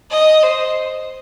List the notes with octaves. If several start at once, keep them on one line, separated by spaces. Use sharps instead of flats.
D#5
C5